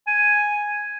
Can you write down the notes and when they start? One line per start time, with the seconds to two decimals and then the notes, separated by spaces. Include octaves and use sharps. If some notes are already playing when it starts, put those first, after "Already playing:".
0.07 G#5